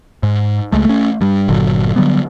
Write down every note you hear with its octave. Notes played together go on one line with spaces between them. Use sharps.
G#2
C#2 G#3 A3
A3 C#4
G2 G3
G1 A#2 D3 F#3
D3 F#3 G3 B3